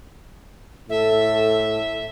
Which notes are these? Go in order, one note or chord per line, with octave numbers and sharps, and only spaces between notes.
A2 A4 E5